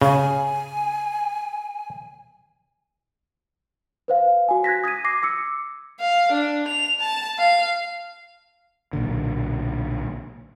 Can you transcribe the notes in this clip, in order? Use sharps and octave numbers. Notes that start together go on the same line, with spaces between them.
C#3 G#5
B4 C5 F5
F#4 G#5
F#6 G#6 A#6 B6
D#6 G#6 B6 D#7
D6 A#6 C7
D6 E6 C#7
F5
D4
F7
A5
F5
B1 A#2 D3